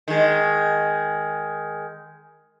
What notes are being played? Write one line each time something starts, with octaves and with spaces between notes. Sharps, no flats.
D#3 G#3